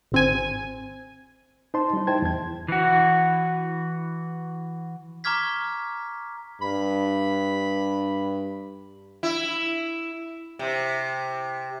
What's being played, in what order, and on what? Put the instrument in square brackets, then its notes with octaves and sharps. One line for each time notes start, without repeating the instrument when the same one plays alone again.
[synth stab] G#1 C4 G#5
[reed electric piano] D#4 C5 A5 C6
G3 D#4
E4 C5 G5 A5 G#6
E2 G#6
[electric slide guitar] E3 F#4
[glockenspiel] A#5 C#6 D6 F6 G#6 B6
[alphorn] G2 [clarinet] B5
[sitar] E4
C3